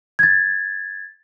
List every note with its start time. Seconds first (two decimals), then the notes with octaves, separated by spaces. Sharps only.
0.19 G#6 A6